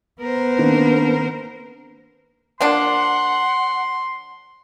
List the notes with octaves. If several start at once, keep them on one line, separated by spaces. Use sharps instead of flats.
B3 A#4 C5
D#3 A#3 C4 D4
F3 A#3 D4 F#5 C6